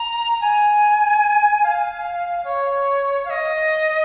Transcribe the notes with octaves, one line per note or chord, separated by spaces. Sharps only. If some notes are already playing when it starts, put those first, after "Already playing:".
Already playing: A#5
A#5
G#5
F5
C#5
F5
D#5